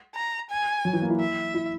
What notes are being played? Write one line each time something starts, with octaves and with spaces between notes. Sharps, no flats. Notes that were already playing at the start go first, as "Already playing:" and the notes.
A#5
G#5
F#3
E3
A#3
E4
E5
E4